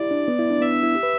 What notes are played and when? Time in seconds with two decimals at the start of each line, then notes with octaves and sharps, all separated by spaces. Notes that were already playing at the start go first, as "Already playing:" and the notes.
Already playing: E4 G4 D5
0.11 D4
0.28 B3
0.39 E4
0.50 D4
0.61 B3 E5
0.72 D4
0.83 E4
0.95 G4
1.03 B4